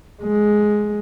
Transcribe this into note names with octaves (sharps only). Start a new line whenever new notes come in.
G#3